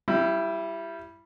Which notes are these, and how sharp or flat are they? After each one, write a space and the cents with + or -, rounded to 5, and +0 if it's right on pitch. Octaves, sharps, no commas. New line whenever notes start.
G3 +0 E4 +20